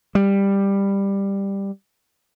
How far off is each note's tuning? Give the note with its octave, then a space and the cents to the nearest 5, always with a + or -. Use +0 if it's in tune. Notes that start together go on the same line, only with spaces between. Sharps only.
G3 +10